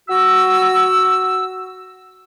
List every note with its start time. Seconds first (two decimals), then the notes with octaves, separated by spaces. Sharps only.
0.09 F#4 E6